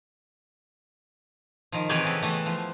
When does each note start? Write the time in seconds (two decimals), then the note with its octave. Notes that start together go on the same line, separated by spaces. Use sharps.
1.72 D#3 F3
1.89 C3 E3 F#3 G#4 B4 G5
2.04 C#3 A4
2.23 E3 A3 B3
2.46 F3